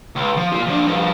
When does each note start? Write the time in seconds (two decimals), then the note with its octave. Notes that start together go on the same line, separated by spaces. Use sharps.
0.16 C#2
0.37 F3
0.52 A#2 F4
0.67 F3 D4
0.87 G2 F3